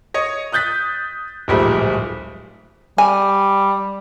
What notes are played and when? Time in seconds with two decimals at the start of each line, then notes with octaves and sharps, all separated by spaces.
0.14 C#5 D#5
0.52 D#6 F#6 G6 A6 B6
1.48 D1 A#1 G#2 G3 A3
2.98 G3 G#5